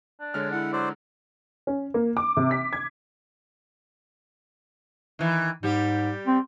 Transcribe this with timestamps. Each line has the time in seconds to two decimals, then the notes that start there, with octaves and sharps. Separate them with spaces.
0.20 D4
0.34 D3 G#3 C#5 F6
0.52 E4 F#5
0.73 F#3 C5 D5
1.67 C#4
1.94 A#3
2.17 D6
2.37 C3
2.51 B6
2.73 G#6
5.19 D#3 E3
5.63 G#2 G3 G4
6.27 C4